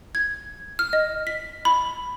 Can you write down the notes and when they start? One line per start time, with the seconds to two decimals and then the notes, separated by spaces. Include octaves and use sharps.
0.15 G#6
0.79 F6
0.93 D#5
1.27 B6
1.65 B5